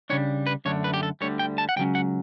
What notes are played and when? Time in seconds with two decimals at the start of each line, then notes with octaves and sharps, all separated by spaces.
0.10 C#3 G3 D4 C#5
0.47 B4
0.65 F#2 D3 A3 D4 C#5
0.84 B4
0.94 G4
1.03 A4
1.21 D2 D3 G3 C#5
1.39 G5
1.58 A5
1.69 F#5
1.76 C#2 C#3 F#3 C#4 G5
1.95 F#5